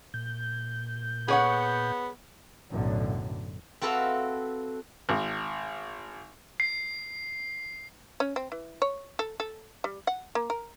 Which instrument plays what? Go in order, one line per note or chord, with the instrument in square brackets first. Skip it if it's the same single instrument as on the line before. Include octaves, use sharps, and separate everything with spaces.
[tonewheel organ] A#2 G6
[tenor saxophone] B3 [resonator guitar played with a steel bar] G#4 C#5 F#5
[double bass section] B1 F#2 A2 D3
[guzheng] C4 F#4 A4 B4 E5 F5
[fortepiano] G#1
[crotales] C7
[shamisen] C#4
C4
E3
C#5
A4
A4
G3
F#5
A#3
A#4